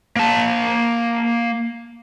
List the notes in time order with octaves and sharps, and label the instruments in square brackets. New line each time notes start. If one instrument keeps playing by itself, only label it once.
[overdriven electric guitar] A#3 A5